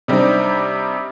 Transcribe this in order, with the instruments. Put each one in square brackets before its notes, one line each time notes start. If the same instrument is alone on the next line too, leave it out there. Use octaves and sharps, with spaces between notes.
[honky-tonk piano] C3 G3 C4 D4 D#4